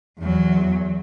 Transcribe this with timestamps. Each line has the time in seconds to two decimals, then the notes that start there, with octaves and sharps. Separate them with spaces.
0.20 E2 F#3